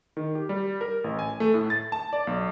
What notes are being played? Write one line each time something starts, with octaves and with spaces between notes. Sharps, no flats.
D#3
G4
G3
A#4
A1
G#5
A3
A2
A6
A5
D5
B1